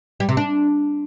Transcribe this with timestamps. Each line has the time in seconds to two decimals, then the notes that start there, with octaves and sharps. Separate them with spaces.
0.20 G3
0.29 C3
0.37 D4